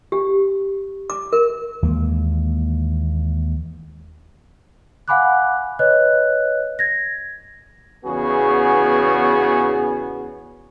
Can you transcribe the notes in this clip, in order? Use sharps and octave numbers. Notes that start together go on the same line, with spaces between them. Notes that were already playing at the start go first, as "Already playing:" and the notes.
G4
D6
A#4
D#2 E3 G#3 A#3
F5 F#5 G#5 B5 D6 F#6
B4 C#5 D#5 F#6
G#6 A#6
E2 C#3 B3 F#4 G#4